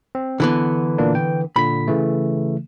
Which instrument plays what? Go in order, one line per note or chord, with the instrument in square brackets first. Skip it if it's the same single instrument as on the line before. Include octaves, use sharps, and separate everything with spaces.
[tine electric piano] C4
[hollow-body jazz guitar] D3 E3 B3 [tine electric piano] A4
[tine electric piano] A#2 A#3 D4
G5
[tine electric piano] A#2 D3 B6 [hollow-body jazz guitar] B5
[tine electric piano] C#3 E3 A3